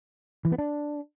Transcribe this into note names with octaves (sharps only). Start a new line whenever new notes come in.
E3
B3
D4